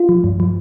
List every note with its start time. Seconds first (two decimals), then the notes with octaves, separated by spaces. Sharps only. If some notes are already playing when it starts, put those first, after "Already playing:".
Already playing: F4
0.09 F3
0.24 G2
0.40 F3